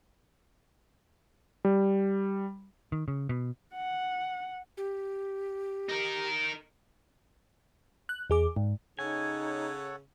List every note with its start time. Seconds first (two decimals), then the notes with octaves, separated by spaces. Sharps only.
1.65 G3
2.92 D#3
3.08 C#3
3.29 B2
3.75 F#5
4.77 G4
5.89 D#4 A#4
8.09 F#6
8.30 E2 G#4 D6
8.56 G#2
8.99 C#3 D#4 A4 C#5 F#5 G#5